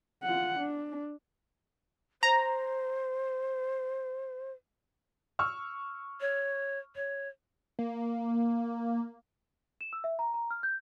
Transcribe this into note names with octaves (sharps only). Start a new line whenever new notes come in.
F4 F#5
D4
C5 A#5
C#6 E6 F6
C#5
C#5
A#3
E7
E6
E5
A#5
A#5
F6
G6